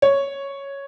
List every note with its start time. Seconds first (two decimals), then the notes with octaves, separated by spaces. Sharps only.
0.02 C#5